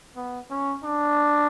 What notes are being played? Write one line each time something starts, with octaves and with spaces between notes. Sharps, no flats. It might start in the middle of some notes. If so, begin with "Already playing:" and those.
B3
C#4
D4